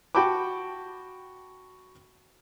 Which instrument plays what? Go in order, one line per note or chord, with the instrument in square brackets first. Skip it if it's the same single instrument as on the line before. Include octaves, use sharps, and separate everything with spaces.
[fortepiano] F#4 G5 A5 B5 D6